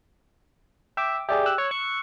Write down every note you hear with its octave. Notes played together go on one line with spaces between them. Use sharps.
E5 G5 D6
G4 G#4 D5 E5
E6 F#6
C#5
C#6